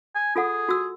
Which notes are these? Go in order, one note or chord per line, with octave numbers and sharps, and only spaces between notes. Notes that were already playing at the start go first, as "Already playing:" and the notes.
G#5
F4 G#4 A4 F#5
F#4 E6